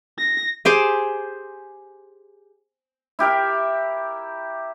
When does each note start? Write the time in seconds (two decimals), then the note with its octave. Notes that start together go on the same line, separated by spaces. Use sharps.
0.18 A#6
0.65 G4 G#4 C5 D6
3.19 E4 G4 A#4 E5